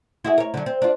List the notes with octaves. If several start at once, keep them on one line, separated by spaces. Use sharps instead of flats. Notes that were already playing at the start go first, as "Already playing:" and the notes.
E4 F#4 G#4
A#4 C#5
D3 F#3
C4
D4 F4